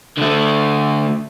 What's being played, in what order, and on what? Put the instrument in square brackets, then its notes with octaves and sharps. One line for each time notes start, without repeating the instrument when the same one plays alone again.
[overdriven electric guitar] D3 A3